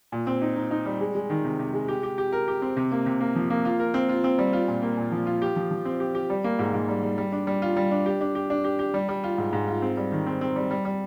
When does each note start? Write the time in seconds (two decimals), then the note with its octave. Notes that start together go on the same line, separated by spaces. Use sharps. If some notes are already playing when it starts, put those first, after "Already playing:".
0.12 A#2
0.27 C4
0.42 D#4
0.56 D#4
0.71 D#4
0.86 G3
1.01 G#3
1.15 G#3
1.30 D#3
1.45 C3
1.59 C3
1.74 G#3
1.88 G4
2.03 G4
2.18 G4
2.33 A#4
2.48 G4
2.62 C4
2.77 C3
2.92 A#3
3.06 C3
3.21 A#3
3.36 F3
3.50 A#3
3.65 F4
3.80 A#4
3.94 C4
4.09 F4
4.24 C4
4.38 G3
4.53 F4
4.68 A#2
4.83 A#3
4.97 A#2
5.12 F3
5.26 F4
5.42 G4
5.56 F3
5.71 F3
5.85 C4
6.00 G4
6.15 G4
6.30 G3
6.44 A#3
6.59 G#2
6.74 G#2
6.88 G3
7.03 G3
7.18 G3
7.32 D4
7.47 G3
7.62 F4
7.77 G3
7.91 D4
8.06 G4
8.21 D4
8.35 G4
8.50 D4
8.64 G4
8.79 G4
8.94 G3
9.09 G3
9.24 F4
9.38 G#2
9.53 G#2
9.67 F4
9.82 C4
9.97 G3
10.12 D#3
10.27 C4
10.41 C4
10.56 G3
10.71 G3
10.85 G3